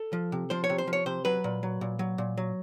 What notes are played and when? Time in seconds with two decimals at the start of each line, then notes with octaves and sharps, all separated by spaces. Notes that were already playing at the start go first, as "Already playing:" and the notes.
Already playing: A4
0.13 F3
0.32 C3
0.50 F3 C5
0.64 C#5
0.70 C3
0.78 C5
0.87 F3
0.93 C#5
1.06 C3 C5
1.25 F#3 B4
1.44 A#2
1.63 F#3
1.81 A#2
1.99 F#3
2.18 A#2
2.38 F#3